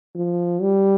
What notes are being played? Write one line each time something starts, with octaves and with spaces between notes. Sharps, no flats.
F3
G3